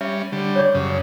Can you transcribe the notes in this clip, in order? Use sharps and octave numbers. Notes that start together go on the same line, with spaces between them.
G3 C#4 E5
D3 G3
C#5 D5 D6
F#2 C#3